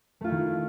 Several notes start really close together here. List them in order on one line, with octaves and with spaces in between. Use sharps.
A3 F4 E4 D#3